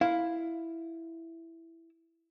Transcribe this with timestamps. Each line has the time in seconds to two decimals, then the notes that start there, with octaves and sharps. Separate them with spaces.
0.01 E4 F5